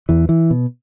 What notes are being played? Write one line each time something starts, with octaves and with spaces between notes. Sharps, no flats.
E2 E3
E3
B2